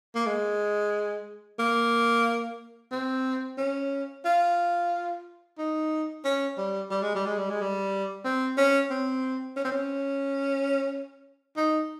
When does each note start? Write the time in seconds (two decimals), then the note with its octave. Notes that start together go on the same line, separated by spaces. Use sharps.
0.15 A#3
0.26 G#3
1.59 A#3
2.92 C4
3.58 C#4
4.25 F4
5.58 D#4
6.24 C#4
6.58 G3
6.91 G3
7.03 G#3
7.15 G3
7.26 G#3
7.38 G3
7.50 G#3
7.61 G3
8.24 C4
8.57 C#4
8.90 C4
9.57 C#4
9.65 C4
9.72 C#4
11.56 D#4